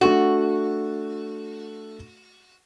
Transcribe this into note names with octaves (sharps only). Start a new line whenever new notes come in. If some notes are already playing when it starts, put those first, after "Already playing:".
A3 D4 F#4 A4